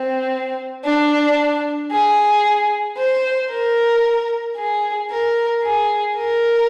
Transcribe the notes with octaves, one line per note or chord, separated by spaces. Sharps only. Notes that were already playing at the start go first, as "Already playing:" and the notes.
Already playing: C4
D4
G#4
C5
A#4
G#4
A#4
G#4
A#4